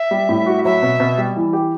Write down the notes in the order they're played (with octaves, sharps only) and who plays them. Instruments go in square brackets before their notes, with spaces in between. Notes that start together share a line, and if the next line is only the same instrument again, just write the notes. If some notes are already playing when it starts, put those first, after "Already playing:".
Already playing: [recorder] E5
[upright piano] G3
A2
F#4
[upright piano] F#3 [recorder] E5
[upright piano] B2
B2
G3
E3
G4